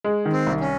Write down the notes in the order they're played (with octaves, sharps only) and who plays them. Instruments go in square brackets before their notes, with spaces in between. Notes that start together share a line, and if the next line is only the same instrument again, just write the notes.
[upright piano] G#3
D#3
[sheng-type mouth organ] C4
[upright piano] C2
[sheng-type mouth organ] C#4